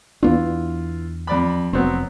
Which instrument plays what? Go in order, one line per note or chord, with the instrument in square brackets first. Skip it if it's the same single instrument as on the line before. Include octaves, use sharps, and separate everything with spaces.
[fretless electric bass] E2 B3 D4 [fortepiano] E3 F4
[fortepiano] F2 D5 B5
[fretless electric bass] F1 [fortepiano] F#3 B3 C4